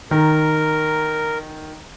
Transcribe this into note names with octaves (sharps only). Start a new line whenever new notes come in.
D#3 A#4